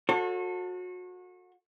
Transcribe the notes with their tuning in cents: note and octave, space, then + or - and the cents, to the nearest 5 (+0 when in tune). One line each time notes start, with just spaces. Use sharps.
F#4 -30 A4 +15 C#5 -40